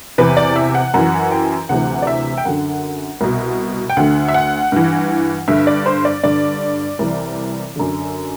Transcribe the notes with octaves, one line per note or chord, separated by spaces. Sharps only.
E2 C3 E3 B4
D5
E5
F#5
F#2 E3 F#5
G5
D2 C3 E3 F#5
D5
E5
G5
F#2 D3 F#5
C2 B2
G5
D2 D3 F#5
E5
F#5
G2 E3
G2 D3 E5
D5
C5
D5
G2 D3 D5
C2 C3 E3
F#2 D3